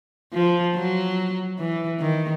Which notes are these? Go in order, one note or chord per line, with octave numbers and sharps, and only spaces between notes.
F3
F#3
E3
D#3